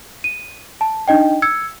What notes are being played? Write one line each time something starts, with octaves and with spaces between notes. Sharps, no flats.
D#7
A5
D4 D#4 D#5 G5
E6 G#6 C#7